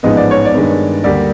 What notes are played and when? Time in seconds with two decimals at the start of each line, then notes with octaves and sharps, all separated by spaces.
0.03 A1 G#2 F3 G#3 B3 D#5
0.17 D5
0.31 C#5
0.45 D5
0.54 G2 D#3 G#3 B3
1.04 D2 D3 G3 A#3 D5